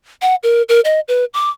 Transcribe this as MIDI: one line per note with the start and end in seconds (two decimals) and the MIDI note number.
0.22 0.35 78
0.43 0.62 70
0.69 0.80 70
0.85 1.00 75
1.08 1.25 71
1.34 1.50 86